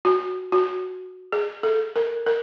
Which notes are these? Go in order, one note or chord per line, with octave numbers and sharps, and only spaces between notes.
F#4
F#4
G#4
A4
A#4
A#4